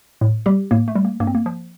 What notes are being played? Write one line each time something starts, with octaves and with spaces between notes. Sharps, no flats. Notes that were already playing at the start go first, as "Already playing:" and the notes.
A2
G3 G4
A2 A#3
A3
G3
A#3
G2 A#3
C4
A#3
F3